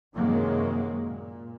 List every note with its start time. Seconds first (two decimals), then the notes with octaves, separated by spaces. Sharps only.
0.15 F#2 C3 D#3 F#3 G#3 A#3
1.04 A#2